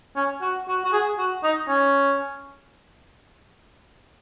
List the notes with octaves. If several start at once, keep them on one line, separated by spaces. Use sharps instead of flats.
C#4
F#4
F#4
F#4
G#4
F#4
D#4
C#4